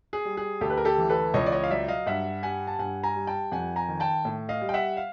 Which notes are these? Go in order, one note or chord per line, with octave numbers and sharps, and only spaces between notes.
G#4
G3
G#4
D2 G4 A4
B4
A#4
G4 A4
E3
A4 B4
C#2 C#5 D#5
D5
C#5 D#5
F5
F#3 D5 E5
D#5 F5
G2 E5 F#5
G3 F#5 G#5
A5
G2 F#5 G#5
G#5 A#5
G3
G5 A5
F2 F#5 G#5
G#5 A#5
D#3
G5 A5
A2
D#5 F5
G3
G5
E5 F#5
F5